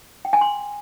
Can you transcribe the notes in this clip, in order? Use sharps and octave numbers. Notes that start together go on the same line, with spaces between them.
G5
G#5
C6